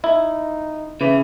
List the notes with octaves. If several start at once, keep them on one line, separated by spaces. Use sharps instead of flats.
D#4 E4
C#3 E3